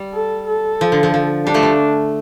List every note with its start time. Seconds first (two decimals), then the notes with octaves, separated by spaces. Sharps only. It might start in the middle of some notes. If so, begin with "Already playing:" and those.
Already playing: G3
0.14 A4
0.48 A4
0.81 F3
0.92 D3
1.03 F3
1.14 F3
1.46 G3 D4
1.54 F3 A3
1.63 G3